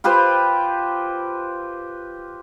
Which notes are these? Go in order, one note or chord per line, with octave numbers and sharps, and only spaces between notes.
F4 G4 B4 C5